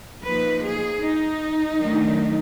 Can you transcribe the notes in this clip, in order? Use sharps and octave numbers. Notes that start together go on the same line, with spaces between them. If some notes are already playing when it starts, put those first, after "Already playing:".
F3 A#3 D#4 B4
G#4
D#4
D#3 F#3 A3 D4